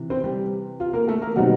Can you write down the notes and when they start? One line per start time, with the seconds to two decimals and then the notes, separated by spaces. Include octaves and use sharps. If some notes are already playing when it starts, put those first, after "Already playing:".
Already playing: C3 E3
0.10 C4 C5
0.24 G3 G4
0.80 F4
0.93 A#3 A#4
1.08 A3 A4
1.21 A#3 A#4
1.36 B2 F#3 G3 C4 D#4 F#4